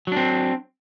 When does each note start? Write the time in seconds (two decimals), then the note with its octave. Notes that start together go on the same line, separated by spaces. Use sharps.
0.07 F#3
0.12 D4
0.16 C4